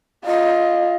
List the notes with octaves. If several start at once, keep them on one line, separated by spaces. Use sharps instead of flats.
F4 D#5